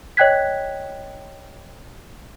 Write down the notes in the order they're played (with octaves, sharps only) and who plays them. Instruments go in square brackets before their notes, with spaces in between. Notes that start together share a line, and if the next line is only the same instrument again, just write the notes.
[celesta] C#5 D#5 G5 F#6 G#6 B6